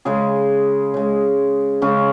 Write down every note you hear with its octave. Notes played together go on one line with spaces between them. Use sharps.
C#3 G#3 G#4
C#3 G#3
C#3 G#3 C#4